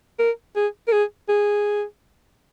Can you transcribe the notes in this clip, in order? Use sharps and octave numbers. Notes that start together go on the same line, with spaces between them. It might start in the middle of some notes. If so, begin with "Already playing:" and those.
A#4
G#4
A#4
G#4
G#4